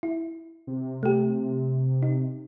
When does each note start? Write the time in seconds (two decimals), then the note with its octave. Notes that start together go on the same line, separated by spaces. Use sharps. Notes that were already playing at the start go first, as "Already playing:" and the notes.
0.03 E4
0.67 C3
1.03 A3 G4
2.03 D#4